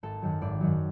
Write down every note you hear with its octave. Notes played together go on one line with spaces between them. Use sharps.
G#1 A4
F#2 D#3 F#3
G#1 D5
F#2 D#3 F#3